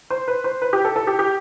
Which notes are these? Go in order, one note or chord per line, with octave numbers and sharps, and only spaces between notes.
C5
B4
C5
B4
G4
A4
A4
G4
G4